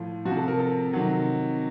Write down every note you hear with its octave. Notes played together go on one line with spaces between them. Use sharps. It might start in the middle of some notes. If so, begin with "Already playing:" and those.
Already playing: A2 F3 F4
C3 F3 F#4
A4
A#4
A4
C3 D#3 F#3